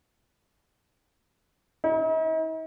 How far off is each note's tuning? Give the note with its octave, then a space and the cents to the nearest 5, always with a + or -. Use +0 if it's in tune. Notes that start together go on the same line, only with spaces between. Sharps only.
D#4 +45